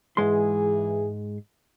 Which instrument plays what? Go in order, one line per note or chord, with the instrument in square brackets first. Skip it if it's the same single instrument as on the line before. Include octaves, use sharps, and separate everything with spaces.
[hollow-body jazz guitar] G#2 G#3 C6 [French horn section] E3 G#4